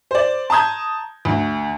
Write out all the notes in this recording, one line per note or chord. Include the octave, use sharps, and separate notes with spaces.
C5 D5
A5 A#5 C6 D#6 G6 G#6
D2